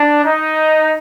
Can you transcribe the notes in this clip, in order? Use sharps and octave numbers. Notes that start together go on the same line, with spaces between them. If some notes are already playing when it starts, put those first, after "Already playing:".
Already playing: D4
D#4